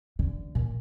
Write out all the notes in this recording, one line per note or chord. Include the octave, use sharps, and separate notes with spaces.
D3
A#2